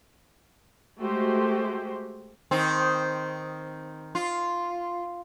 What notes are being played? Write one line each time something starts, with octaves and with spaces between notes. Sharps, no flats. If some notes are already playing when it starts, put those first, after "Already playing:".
G#3 A3 F#4 G4 C5
D#3 C4
F4